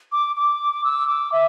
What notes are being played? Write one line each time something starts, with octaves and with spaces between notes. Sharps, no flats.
D6
D6
E6
D6
E5